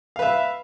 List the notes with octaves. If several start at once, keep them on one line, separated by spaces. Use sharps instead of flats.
B4 E5 F5